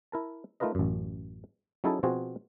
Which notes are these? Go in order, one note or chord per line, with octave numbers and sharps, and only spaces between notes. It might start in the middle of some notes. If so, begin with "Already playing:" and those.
E4 A#4 A5
A3 D#4 F4 A#4 B4 D#5
A1 F#2
F#3 C#4 D#4 E4 G#4 A4
B2 F3 C4 F4 F#4 G#4